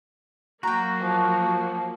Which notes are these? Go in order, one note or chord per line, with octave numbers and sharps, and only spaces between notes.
F#3 A#3 F#4 G5 A#5
F3